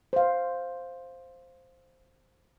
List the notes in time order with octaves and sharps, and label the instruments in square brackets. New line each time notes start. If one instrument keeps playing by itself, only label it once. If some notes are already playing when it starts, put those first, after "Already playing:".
[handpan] C5 F5